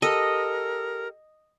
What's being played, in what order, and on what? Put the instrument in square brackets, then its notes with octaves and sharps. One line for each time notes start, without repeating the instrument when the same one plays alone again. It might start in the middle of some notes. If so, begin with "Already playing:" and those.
[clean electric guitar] G4 A4 [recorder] A#4 [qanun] D#5